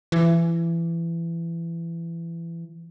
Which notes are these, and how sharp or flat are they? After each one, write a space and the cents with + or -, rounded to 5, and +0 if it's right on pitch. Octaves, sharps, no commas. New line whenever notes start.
E3 +25